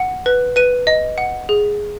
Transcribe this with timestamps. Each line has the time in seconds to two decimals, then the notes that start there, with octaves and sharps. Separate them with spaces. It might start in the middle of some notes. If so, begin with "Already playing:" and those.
Already playing: F#5
0.26 B4
0.56 B4 D#7
0.87 D#5
1.18 F#5
1.49 G#4